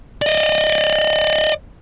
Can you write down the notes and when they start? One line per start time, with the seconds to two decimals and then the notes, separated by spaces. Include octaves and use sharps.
0.22 D5 D#5